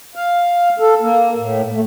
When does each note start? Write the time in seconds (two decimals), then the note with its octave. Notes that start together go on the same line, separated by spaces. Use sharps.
0.15 F5
0.79 A4
1.01 A#3
1.37 A2
1.72 A3